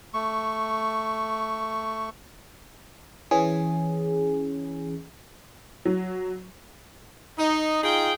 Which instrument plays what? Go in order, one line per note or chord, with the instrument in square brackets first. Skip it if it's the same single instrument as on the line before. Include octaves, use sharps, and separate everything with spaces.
[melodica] A3 C#6
[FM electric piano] E3 C#4 G#4
[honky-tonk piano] F#3
[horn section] D#4
D#4 F4 G#4 G5